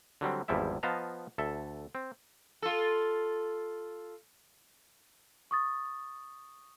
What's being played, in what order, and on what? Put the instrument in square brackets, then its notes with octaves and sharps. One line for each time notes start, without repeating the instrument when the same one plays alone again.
[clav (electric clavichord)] D3 F#3 G3 C4
G#1 E2 F3 G3 E4 E5
F3 B3 D#5 F5 A5 A#5
D2 A4 E5
C4
[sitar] F4 A4
[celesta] C#6 D#6 A6